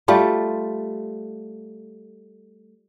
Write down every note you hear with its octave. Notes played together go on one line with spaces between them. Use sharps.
G3 A3 F4